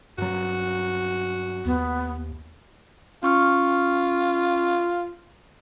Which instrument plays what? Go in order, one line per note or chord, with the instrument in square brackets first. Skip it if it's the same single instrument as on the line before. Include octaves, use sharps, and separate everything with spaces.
[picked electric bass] G2 F#3 [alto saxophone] F#4
[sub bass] D#2 [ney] B3
[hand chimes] C#4 C#6 F6 [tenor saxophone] F4